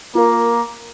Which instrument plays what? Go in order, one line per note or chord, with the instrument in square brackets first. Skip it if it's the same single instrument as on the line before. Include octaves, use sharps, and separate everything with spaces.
[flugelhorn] A#3 [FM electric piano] F4 A#4